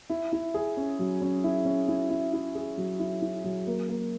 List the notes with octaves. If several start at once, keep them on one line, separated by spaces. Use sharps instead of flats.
E4
E4
G#4
C#4
F#3
C#4
E4
C#4
E4
E4
E4
G#4
F#3
E4
E4
F#3
A#3
A#3